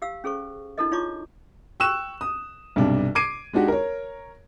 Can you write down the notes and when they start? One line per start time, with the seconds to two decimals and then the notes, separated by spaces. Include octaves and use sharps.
0.02 G4 F5 E6
0.24 C#4 G#4 A4 C5 C#6
0.78 D4 E4 F#4 A4 A#4 D#5
0.91 D#4 F4 C#5 A#5 C#6 D6
1.80 G5 C#6 E6 F#6 E7
2.21 D#6
2.76 B1 G2 C3 D4
3.15 D6 G#6 C7 D7 D#7
3.53 G#3 D4 D#4 F#4 G4
3.68 A#4 C#5